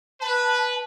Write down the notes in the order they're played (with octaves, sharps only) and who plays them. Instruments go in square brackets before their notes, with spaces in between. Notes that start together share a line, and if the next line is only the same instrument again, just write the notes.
[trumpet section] B4 [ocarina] A5